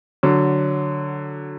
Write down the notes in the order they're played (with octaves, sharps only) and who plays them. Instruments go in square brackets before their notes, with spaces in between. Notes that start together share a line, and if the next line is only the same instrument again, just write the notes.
[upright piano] D3 F#3